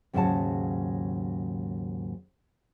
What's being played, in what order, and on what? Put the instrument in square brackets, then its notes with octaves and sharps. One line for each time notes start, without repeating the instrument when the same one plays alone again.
[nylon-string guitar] D#2 G#2 C#3 F#3 F#5 A5